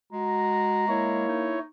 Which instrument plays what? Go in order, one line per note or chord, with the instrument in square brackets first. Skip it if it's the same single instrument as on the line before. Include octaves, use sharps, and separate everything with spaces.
[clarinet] G#3 [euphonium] F#4 [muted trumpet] A#5
[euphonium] A#3 [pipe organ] E4 C#5
[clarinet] D#4